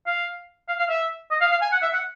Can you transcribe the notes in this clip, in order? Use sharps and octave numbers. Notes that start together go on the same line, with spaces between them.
F5
F5
F5
E5
D#5
F5
F5
G#5
F#5
E5
F#5